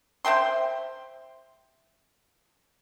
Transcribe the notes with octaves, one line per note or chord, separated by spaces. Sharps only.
C5 E5 G5 C6